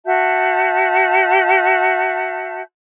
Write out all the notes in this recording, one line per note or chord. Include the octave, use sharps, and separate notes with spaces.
F#4 E5 A5 G6